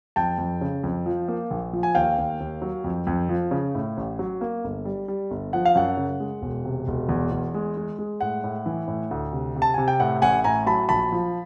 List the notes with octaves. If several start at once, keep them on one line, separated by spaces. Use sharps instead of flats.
F2 G5 A5
F2
C#3
F2
F3
A#3
A#1
F3
G#5
D#2 F5 G5
D#2
D#2
F#3
F2
F2
F3
C#3
A2
A1
F#3
A#3
G1
G3
G3
G1
F3 F#5
F5
F#2 F#5
C#3
G#3
E1
C3
E1
E2
E2
G#3
G#3
G#3
A2 F#5
A2
E3
A2
D2
C3
C3
A5
C3 G#5
G5
A2 F#5
A1 F#5 G#5
A2 G#5 A#5
F#3 A5 B5
A#1 A5 B5
F3